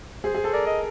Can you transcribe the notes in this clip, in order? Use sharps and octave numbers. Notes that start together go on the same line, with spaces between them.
G#4 C5
G#4
A4
A#4 D5
D#5